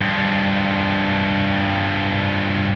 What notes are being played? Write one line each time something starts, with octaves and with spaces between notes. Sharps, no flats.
G2 F3